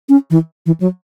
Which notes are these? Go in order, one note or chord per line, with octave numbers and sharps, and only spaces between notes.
C#4
E3
E3
F#3